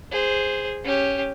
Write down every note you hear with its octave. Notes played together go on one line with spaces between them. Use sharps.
G#4 C5
C#4 G4